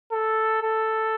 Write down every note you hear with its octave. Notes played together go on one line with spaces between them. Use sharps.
A4
A4